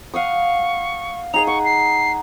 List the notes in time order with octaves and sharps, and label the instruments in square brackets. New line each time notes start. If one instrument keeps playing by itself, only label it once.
[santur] F5 F#5 D#6 [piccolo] C#6
[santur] D#4 G#4 D#5 [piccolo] F7
[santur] F#5 [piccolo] C#6
[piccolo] C7